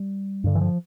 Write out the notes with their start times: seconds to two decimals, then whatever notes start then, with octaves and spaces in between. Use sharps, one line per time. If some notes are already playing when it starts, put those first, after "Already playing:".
Already playing: G3
0.44 G2 D3
0.55 E3
0.61 F3